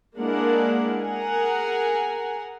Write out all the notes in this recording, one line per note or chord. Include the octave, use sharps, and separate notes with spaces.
G#3 A#3 D4 E4 A#4 F#5
G#4 A#4 F#5 G#5 A#5